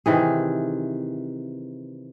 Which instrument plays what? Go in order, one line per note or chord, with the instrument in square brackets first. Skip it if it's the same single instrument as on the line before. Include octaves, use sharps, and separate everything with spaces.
[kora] C3 D#3 E3 G#4